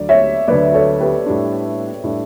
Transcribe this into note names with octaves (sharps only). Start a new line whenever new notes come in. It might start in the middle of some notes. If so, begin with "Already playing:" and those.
Already playing: D2 D3 F#3 D5
C#5 E5
D2 D3 F#3 B4 D5
A4 C#5
G4 B4
A2 G3 D4
A2 G3 D4